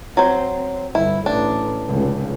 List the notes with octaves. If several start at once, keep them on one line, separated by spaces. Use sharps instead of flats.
F#3 C4 C5
G1 E4
A1 D4
F1 C#2